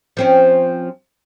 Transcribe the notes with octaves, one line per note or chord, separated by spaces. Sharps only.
F3 C4 C#4